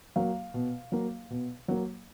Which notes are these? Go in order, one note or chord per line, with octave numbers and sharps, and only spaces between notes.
F#3 A#3 F5
B2
F#3 A#3
B2
F#3 A#3